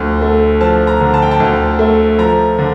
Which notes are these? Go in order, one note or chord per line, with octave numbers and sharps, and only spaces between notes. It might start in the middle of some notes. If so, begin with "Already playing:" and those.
Already playing: D2 D3 F3
A3
F3 A5
A#5
D3
A5
G5
A5
D2
A3
F3 A#5
D3